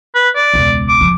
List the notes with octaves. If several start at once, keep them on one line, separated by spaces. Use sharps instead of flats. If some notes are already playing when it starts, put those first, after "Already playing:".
B4
D5
E1 C#2
D6
F3 C4